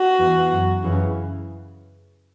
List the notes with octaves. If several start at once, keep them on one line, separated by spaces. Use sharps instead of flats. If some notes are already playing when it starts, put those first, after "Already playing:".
Already playing: F#4
E2 E3
F#2 F#3
F#2 C#3 E3